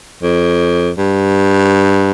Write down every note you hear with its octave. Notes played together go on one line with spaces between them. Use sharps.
F2
G2